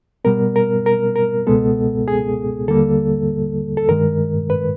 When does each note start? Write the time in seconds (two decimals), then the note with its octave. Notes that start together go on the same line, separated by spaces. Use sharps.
0.24 B2 G3 B3 A#4
0.56 A#4
0.86 A#4
1.16 A#4
1.47 C#2 B2 G#3 B3 A4
2.08 G#4
2.68 D#2 D3 G3 A#3 A4
3.77 A4
3.89 G2 D#3 G#3 A#4
4.50 B4